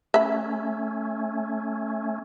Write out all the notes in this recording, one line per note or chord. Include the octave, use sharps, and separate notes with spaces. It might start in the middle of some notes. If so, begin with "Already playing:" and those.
A3 C#4 E5 B5